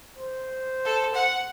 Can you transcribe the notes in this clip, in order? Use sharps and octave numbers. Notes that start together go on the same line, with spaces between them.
C5
A4
F#5